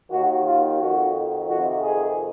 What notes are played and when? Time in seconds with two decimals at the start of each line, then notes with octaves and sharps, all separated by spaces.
0.11 D#2 D#3 F#4
0.45 F4
0.79 F2 D#3 F#4
1.48 F2 C3 D#3 F#4
1.82 G#4